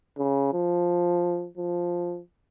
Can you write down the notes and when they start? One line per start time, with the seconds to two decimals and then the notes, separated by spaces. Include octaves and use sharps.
0.18 C#3
0.53 F3
1.57 F3